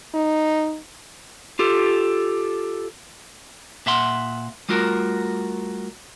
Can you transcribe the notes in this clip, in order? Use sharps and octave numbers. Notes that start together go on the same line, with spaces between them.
D#4
F4 G4 A4
A#2 E5 F#5 C6
G3 A3 F4 F#4 A#4